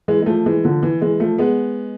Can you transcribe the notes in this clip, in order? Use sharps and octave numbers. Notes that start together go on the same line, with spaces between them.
E3 G#3
G#3
F3 A3
E3 G#3
D3 F3
E3
E3 G#3
F3 A3
G#3 B3